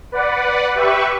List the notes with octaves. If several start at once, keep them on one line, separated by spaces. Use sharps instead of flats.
B4 D5 F#5
G4 B4 E5 C#6